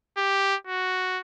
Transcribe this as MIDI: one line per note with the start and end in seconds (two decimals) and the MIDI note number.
0.17 0.56 67
0.67 1.20 66